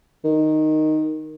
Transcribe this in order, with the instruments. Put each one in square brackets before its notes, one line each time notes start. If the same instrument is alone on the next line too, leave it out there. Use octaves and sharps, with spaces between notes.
[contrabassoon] D#3